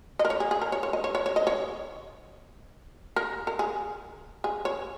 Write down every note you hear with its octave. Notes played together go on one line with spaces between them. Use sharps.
D#5
A#4
C#5
G#4
G#4
A#4
C#5
C#5
D#5
C#5
C#5
C#5
D#5
C#5
A#4
A#4
G#4
G#4
C#5